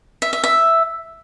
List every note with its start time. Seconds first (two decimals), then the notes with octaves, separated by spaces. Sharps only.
0.22 E5
0.33 E5
0.44 E5